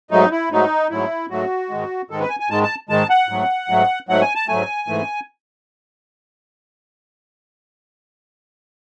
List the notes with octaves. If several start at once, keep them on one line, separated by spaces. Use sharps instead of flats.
G#2 F#3 A3 D#4
E4
G#2 F#3 A3 D#4
G#2 F#3 A3 E4
G#2 F#3 A3 F#4
G#2 D#3 G#3
G#2 D#3 G#3 A4
B4
G#5
G#5
G#2 D#3 G#3 A5
A5
G#2 D#3 G#3 A5
F#5
G#2 F#3 A3
G#2 F#3 A3
G#2 F#3 A3 F#5
G#5
A5
G#2 F#3 A3 G#5
G#2 E3 A3